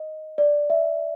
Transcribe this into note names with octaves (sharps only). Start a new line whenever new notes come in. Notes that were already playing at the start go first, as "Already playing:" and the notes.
Already playing: D#5
D5
E5